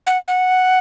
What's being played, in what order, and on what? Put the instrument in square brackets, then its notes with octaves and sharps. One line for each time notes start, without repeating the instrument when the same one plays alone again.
[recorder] F#5
F#5